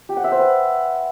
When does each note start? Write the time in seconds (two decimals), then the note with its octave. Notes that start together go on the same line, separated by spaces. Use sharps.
0.09 G4
0.17 F#5
0.24 E5
0.31 C5
0.39 B4